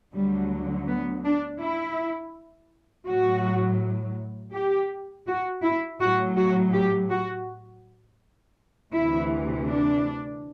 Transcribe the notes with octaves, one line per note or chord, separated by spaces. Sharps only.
D2 D3 F#3 G3
B3
D4
E4
A2 F#3 F#4
G4
F#4
E4
A2 F#3 F#4
F#4
G4
F#4
D2 C3 E3 E4
D4